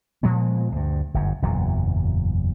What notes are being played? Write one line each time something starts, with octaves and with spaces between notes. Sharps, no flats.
A#2 F3 G#3 B3
D2 G2
G1 F#2
F#1 E2 A#2 F#3